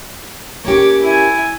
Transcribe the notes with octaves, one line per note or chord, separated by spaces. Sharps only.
A#3 C#4 G4 C#5 D6
E4 G#5